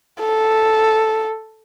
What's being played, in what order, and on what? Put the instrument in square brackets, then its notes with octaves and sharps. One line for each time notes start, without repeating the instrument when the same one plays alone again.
[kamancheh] A4